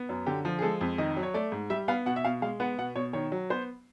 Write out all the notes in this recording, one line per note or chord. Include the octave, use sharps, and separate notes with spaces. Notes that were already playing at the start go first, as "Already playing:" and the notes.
Already playing: B3
F#2
D3 G4
F3
G#4
G#3 A4
F2
D#3 D#5
F#3
C#5
A3 D5
G#2
G3 E5
B3 F5
B2 F#5
E5
B2 F5
G#3 F5
B3 F#5
B2 F#5
B2 C#5
D#3 C#5
F#3
B3 C5